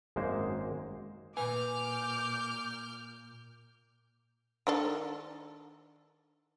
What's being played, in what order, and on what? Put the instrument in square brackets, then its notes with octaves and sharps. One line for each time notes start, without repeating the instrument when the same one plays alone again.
[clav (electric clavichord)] G#1 F#2 G#3 A#3 C5
[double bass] A#2 [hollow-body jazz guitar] B4 G#5 [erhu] D6 [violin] F6 G6
[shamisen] D#3 D4 A4